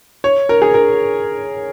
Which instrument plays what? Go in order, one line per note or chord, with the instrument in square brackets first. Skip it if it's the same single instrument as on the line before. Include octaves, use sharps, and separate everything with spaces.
[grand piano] C#5
A#4
G#4
A#4